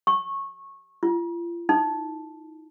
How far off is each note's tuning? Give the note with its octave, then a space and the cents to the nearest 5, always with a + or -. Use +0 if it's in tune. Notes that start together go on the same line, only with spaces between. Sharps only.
C#6 -15
F4 -35
D#4 +15